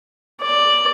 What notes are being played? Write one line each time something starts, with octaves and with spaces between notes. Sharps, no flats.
D5